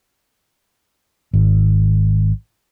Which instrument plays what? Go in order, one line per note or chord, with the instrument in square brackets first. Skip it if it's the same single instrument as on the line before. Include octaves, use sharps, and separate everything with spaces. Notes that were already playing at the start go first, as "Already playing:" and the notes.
[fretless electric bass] G#1